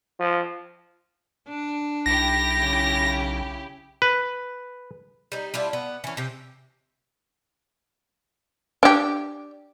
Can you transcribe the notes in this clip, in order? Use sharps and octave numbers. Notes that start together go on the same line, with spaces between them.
F3
D4
B1 E4 G4 A#6
C#3
B4
G3 D#4
G3 D4 E4 F4
B3
E3 C#4
C3 G4
D4 G4